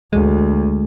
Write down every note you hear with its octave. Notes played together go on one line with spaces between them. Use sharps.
D2 G#3